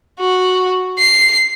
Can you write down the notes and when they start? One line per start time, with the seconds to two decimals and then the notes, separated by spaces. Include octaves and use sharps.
0.20 F#4
0.99 C7